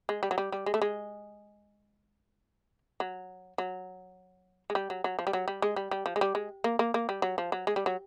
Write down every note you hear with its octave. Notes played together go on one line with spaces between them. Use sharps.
G#3
G3
F#3
G3
G3
G#3
A3
G#3
F#3
F#3
G#3
G3
F#3
F#3
F3
G3
F#3
G3
G#3
G3
G3
F3
G#3
G3
G#3
A#3
A#3
A#3
G3
F#3
F3
F#3
G#3
G3
F#3